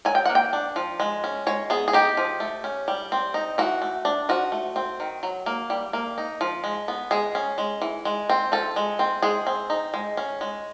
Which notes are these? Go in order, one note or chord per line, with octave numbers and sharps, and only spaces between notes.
F#3 G#5
G5
A#3 F#5
G5
D4
F3
G#3
C#4
G#3 C#5
B3 G#4
G#4
D#4 G4
F3
A3
C#4
G3
C4
D#4
E3 F#4
A3
D4
F3 F#4
A3
C4
D#3
F#3
A#3
G3
A#3
D#4
F3
G#3
B3
G#3 G#4
C#4
G#3
E3
G#3
C4
F3 A4
G#3
C4
G#3 G#4
C4
D#4
G#3
C#4
G#3